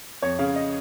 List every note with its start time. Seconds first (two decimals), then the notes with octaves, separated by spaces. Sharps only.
0.22 F2 C#5
0.39 C#3 F5
0.56 D#5